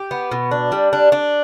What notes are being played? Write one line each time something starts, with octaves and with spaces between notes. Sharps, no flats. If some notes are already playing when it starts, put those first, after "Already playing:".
Already playing: G4
B3
B2
D4
G3
D4
D4